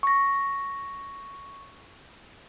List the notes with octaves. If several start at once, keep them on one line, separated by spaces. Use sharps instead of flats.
C#6 A#6